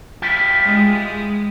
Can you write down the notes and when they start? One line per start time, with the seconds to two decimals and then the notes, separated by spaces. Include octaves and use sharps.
0.22 E4 F4 G4
0.65 G#3